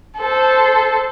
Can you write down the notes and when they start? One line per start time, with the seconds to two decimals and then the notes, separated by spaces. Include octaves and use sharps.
0.19 A4 C5